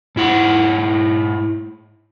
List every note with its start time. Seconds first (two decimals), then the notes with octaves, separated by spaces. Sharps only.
0.16 G#2 E4 F#5